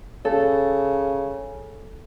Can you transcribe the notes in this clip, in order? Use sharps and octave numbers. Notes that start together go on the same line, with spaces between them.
C#3 A4